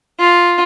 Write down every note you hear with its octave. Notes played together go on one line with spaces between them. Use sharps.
F4